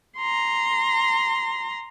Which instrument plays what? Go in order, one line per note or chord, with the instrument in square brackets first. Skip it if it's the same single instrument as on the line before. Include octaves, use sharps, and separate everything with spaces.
[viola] A#5 C6